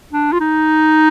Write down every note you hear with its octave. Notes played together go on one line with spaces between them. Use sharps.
D4
F4
D#4